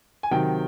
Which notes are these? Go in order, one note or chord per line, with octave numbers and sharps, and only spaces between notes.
G#5
C3 D#3 F#3 G5